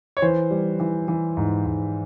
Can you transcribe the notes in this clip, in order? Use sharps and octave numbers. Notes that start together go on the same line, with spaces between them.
C#5
E3 C5
G3
E3
E3
G#2
G#2